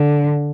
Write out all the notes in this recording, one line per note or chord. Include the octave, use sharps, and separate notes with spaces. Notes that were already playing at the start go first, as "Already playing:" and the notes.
Already playing: D3